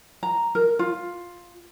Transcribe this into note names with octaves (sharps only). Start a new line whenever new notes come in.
A#5
A#4
F4